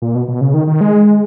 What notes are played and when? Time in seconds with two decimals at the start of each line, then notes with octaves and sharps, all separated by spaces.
0.02 A#2
0.15 B2
0.28 B2
0.41 C#3
0.54 D#3
0.67 D#3
0.81 G#3